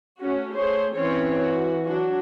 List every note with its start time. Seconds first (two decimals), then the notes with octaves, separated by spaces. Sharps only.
0.21 A3 C#4 F#4
0.56 A3 G#4 C5 C#5
0.93 E3 C4 C#4 C#5
1.42 F#4
1.84 F#3 D4 F#4